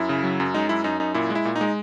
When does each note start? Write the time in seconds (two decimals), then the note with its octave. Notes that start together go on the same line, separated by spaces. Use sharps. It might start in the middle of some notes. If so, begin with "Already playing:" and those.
Already playing: F#2 E4
0.09 C#3
0.23 F#3
0.40 F#2
0.54 G#3 D#4
0.69 F#2 E4
0.84 F#2 D#4
1.00 F#2 D#4
1.14 A#2 E4
1.30 G#3
1.35 E4
1.45 A#2
1.56 D#4
1.61 G#3